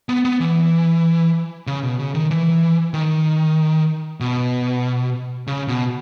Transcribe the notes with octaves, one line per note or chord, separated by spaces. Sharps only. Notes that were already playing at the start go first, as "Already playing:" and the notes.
B3
B3
E3
C#3
B2
C#3
D#3
E3
D#3
B2
C#3
B2